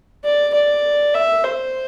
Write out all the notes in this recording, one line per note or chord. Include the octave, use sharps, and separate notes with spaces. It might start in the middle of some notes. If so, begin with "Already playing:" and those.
D5
D5
E5
C5